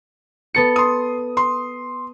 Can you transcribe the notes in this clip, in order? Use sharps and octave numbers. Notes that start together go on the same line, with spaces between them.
B3 A4 C#7
C6 D#6
C6